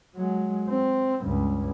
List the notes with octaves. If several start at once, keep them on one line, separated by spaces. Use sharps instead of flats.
F#3 G#3
C4
C#2 G2